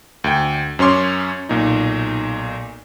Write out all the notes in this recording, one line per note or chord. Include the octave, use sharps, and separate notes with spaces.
D2 G5
F#2 C#4 C#5 C6 D6
B1 A#2 D#4